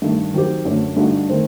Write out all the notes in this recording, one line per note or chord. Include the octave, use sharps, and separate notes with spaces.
G2 D#3 A3
D#3 F#3 C4 G4
F#2 D3 A3
G2 D3 A3 D#4 F#4
D#3 A3 C4 D#4